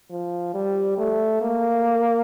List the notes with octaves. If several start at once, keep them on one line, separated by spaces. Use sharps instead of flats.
F3
G3
A3
A#3